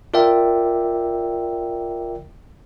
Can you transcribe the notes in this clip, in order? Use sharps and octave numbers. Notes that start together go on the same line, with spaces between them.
F4 A#4 D5 E5 G5